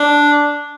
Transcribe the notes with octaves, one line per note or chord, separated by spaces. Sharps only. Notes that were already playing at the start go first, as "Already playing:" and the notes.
Already playing: D4